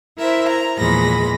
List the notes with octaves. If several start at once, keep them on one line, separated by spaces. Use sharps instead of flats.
E4 A#4 C5 E5
A#5
E2 A#2 F3 G#3 B5 A#6